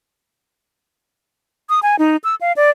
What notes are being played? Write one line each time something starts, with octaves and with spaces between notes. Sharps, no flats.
D#6
G#5
D#4
E6
F5
D5